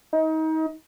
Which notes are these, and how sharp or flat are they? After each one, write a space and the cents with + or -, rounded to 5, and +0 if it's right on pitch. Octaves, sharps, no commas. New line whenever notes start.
D#4 +30